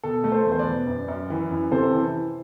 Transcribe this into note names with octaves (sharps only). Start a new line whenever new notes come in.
B2 A4
A3
A4 C5
E2
C5
B4 D5
B2
F#2
F#2
E3
F#2
C3 A4 C5
E3